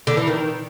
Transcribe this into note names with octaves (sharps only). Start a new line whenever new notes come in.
D3
E3
D#3